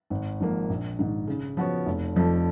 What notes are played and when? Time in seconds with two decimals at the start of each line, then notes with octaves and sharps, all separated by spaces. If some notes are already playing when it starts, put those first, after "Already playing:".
0.10 G#1
0.40 G#2 F3 A#3
0.69 A#1
0.99 G#2 D#3
1.27 C#3
1.57 F3 B3 F#4 C#5
1.86 F1
2.16 F2 F3